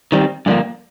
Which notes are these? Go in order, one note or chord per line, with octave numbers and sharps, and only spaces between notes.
D#3 G3 C4
G2 D3 F3 A#3